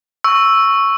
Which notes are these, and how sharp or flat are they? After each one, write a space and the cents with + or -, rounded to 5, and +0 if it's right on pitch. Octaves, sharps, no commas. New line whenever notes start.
C#6 +0 E6 +0